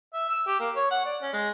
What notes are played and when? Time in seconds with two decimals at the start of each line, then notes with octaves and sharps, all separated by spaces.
0.14 E5
0.29 E6
0.46 G4
0.60 A#3
0.76 C#5
0.91 F#5
1.05 D5
1.22 C#4
1.33 G#3